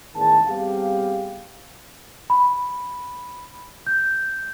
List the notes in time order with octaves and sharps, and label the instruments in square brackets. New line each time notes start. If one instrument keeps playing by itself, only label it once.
[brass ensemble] A1 E2 G#2 D#3 A5
G3 B3 C4 G4 G#4 F5
[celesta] B5
G6